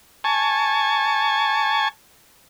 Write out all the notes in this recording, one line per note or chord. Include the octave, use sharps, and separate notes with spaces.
G#5 A5 C#6